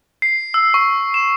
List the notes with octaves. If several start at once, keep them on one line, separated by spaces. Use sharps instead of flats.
C7
E6
C#6
E7